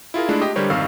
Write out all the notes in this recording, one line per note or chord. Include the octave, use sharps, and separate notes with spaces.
E4 F4 G#4 A#4
G#3 A3 D4 E4
G4 D#5
D3 G3 A#4 C5 C#5
G#1 F2 D#3 F5 C#6 E6